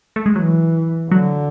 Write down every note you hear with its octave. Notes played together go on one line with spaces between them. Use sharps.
A3
G#3
E3 F#3
D3 F#3